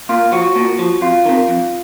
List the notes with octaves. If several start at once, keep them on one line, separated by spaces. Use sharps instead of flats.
A#2 F4
F3 F#4
A#2
F3
F2 F4
C3 D#3
F2